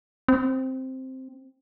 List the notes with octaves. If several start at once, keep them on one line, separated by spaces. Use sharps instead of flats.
C4